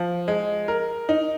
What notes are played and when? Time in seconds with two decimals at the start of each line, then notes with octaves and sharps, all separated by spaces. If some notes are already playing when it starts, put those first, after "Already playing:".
Already playing: F3
0.28 G#3
0.68 A#4
1.09 D#4